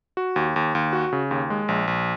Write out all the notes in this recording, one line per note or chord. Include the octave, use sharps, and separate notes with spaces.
F#4
D#2
D#2
D#2
F#4
C#3
D#2
G#3
A#1
A#1